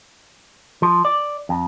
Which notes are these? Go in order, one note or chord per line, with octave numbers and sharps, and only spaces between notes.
F3
D5
F2